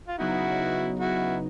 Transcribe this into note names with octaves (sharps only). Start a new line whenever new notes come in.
F4
C#3 F#3 B3 D#4 E4 F#4
E4 F#4